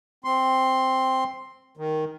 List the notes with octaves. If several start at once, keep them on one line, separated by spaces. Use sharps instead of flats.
C4 C6
D#3